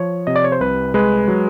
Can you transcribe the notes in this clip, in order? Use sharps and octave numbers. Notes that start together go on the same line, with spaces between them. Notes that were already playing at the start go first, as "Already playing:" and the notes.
Already playing: F3 C#5
C3 D#5
D5
C#5
C5
C2 B4
G#3 B4
F#3